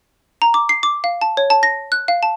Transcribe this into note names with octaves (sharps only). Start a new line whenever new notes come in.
A#5
D6
C7
D6
F5
A5
C#5
A5
A#6
F#6
F5
A5